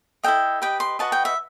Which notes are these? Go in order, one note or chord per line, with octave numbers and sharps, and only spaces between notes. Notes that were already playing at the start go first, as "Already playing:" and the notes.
E4 A4 D#5 G5
G4 B4 D#5 G5
C6
F#4 B4 D#5 A5
G5
E5